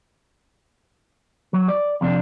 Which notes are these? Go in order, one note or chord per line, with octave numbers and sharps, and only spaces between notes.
F#3
D5
F2 C3 D4